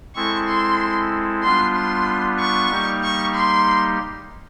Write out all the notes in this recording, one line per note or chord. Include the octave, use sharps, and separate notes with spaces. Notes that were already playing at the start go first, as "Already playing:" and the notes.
G#3 C4 E4 A4 C#6
C6
G3 B3 D4 F4 C6
C6
C#6
G3 A#3 D#4 G4
C#6
C6